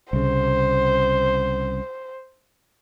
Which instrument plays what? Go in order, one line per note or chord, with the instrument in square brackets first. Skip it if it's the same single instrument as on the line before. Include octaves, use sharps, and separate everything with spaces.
[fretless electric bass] C2 C#3 [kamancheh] C5